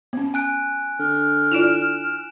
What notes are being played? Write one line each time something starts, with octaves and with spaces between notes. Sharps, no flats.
B3 C#4
G#5 F#6 D7
D3 F6
E4 F4 D5 D7 E7 F7